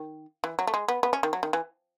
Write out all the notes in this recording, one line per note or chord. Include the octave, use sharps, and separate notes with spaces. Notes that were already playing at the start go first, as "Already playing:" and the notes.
Already playing: D#3
E3
F#3
A3
G#3
B3
B3
C#4
D#3
F#3
D#3
E3